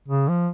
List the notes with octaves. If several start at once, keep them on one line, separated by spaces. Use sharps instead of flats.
C#3
F3